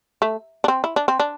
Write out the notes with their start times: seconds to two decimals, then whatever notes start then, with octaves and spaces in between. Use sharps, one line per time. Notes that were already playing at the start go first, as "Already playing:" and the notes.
0.22 A3
0.64 D4
0.68 C4
0.84 E4
0.96 D4
1.08 C4
1.20 D4